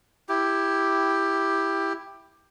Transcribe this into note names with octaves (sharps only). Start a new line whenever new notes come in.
E4 G4